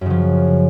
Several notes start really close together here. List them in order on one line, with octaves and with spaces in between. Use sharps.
F#2 C#3 F3